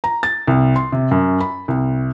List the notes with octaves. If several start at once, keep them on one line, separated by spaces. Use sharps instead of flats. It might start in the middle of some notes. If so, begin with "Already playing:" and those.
A#5
A6
C2
C6
C3
F#2
B5
C2